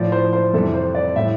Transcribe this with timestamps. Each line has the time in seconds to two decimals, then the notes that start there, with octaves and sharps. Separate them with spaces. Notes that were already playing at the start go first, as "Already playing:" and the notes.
Already playing: A2 F3 D5
0.12 C5
0.33 C5
0.53 F2 C3 E3 G3 A4
0.74 C5
0.95 D5
1.16 A2 G3 E5